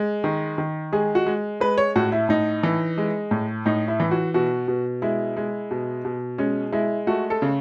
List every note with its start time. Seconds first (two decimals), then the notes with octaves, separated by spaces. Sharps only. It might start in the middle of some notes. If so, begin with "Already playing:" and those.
Already playing: G#3
0.24 D#3
0.58 D#3
0.92 G#3 G#4
1.15 F#4
1.26 G#3
1.60 G#3 B4
1.78 C#5
1.96 A2 F#4
2.12 E4
2.29 A2 D#4
2.63 E3
2.98 G#3
3.31 A2
3.66 A2 D#4
3.88 E4
4.00 E3
4.11 F#4
4.34 B2 F#4
4.68 B2
5.02 G#3 E4
5.37 G#3
5.71 B2
6.05 B2
6.38 G#3 C#4
6.72 G#3 E4
7.07 A3 F#4
7.30 A4
7.42 C#3